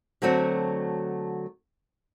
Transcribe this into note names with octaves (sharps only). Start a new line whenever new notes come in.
D3 F#3 A3 C4 F#4 C#5